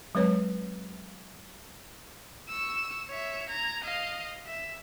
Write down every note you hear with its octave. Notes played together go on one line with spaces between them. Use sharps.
F#3 G#3 C4 B4 C#5
C#6 E6
C#5 E5
A#5 G#6
D#5 F5
E5